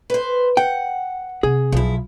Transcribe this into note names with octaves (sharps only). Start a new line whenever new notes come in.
B4 C5
F#5 G5
C3 G#4
B1 F3 E4